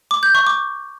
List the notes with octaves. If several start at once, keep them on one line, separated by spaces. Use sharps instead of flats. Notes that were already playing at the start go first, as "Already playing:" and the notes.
D6
G6
C#6
D6